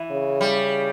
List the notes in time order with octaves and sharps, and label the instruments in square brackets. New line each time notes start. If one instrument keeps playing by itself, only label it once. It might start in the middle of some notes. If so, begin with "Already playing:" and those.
Already playing: [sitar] E3
[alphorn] C#3
[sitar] G3